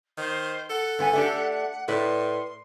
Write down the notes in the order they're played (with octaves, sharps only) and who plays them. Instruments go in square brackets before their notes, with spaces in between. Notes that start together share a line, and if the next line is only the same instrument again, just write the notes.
[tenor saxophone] D#3 [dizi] C5
[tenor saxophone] A4 [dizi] F#5
[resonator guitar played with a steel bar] G2 B3 G#5
A3 D4 G4
[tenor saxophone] A2 [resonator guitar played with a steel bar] B4 D5 [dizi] C6